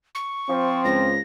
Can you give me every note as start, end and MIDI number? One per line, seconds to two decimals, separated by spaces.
0.15 0.84 85
0.49 1.17 53
0.49 1.08 60
0.85 1.20 37
0.85 1.21 94